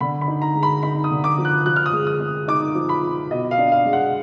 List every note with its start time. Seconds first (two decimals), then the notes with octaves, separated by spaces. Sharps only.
0.01 D3 B5
0.21 B5
0.28 D#4
0.42 A#5
0.55 G#3
0.63 B5
0.83 D#4 B5
1.04 D#6
1.11 D3
1.24 D6
1.38 F3
1.45 F#6
1.66 F3 F#6
1.76 F6
1.86 D#6
1.93 G#3
2.07 D#6
2.21 G#3
2.48 D#4 D6
2.75 F3
2.89 B5
3.03 F3
3.31 B2 D#5
3.51 F5
3.58 D4
3.72 F5
3.85 G#3
3.93 F#5